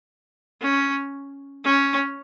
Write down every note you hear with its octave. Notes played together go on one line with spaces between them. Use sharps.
C#4
C#4